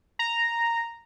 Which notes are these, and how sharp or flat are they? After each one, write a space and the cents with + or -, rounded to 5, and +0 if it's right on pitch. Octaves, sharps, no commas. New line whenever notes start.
A#5 -5